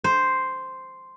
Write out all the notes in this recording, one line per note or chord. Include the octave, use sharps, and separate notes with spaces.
C5